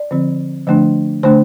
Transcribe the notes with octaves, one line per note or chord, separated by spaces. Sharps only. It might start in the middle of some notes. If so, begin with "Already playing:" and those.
Already playing: D5
D3 F3 C4
D3 F3 A3 D4
D3 A3 D4 C5